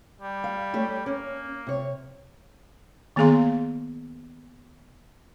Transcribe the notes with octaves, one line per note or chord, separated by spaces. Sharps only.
G3
F5
A3 G4 C#5
A#3 C#4
C3 C#5
D#3 A#3 B3 G#4 F5 C6